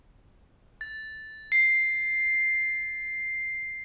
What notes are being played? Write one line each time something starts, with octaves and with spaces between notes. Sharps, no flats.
A6
C7